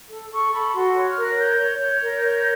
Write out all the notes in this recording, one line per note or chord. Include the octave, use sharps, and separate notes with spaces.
A4
A4 C#6
A4 B5
F#4 C6
C#5
F6
A#4
F#6
C#5 G6
C#5
C#5 G6
A#4
C#5